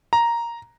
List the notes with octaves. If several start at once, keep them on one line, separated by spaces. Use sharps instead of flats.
A#5